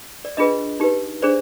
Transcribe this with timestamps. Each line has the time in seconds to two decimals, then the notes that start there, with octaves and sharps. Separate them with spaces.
0.25 D5
0.37 D4 F4 G#4 B4 D#5
0.80 D#4 G4 B4
1.22 D4 G#4 C5 D5